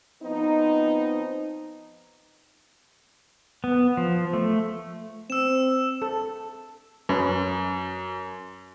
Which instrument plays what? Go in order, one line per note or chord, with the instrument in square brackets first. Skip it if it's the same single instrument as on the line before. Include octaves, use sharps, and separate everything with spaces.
[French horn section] F3 B3 C4 D#4
[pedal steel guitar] B3
F3
A3
[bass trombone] C4 [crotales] E6 E7
[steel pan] A4
[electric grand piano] F#2 [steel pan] C#4 B4